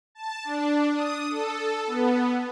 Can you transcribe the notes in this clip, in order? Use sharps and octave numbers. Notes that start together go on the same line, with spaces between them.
A5
D4
D#6
A4
B3